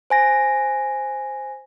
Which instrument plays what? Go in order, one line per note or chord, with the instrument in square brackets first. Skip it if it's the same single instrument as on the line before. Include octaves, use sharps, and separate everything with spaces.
[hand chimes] C5 G#5 A#6